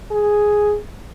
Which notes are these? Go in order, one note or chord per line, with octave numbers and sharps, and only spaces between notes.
G#4